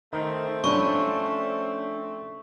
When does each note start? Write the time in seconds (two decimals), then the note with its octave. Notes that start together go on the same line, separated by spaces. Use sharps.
0.13 D#3 A3 C4 D#4 A#4
0.64 F3 C#4 D4 E4 C#5 C#6